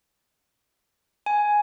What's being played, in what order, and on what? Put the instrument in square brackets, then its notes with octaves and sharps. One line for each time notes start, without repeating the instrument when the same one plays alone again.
[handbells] G#5